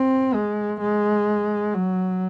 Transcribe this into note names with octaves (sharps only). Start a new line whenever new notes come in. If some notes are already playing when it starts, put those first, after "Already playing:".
Already playing: C4
G#3
G#3
F#3